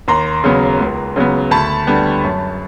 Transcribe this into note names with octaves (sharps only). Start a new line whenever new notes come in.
D#2 A#5 C6
C#3 F#3 B3
C#2
C#3 F#3 B3
D2 A5 B5
D3 G3 B3
F#2